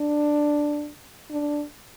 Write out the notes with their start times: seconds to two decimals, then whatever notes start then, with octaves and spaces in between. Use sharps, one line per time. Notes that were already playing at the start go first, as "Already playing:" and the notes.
Already playing: D4
1.31 D4